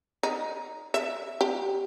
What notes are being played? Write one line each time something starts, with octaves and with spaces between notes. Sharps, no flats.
D#4
E5
G4